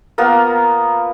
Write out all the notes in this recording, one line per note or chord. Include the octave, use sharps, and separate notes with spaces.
A#3 B3 F4 A#4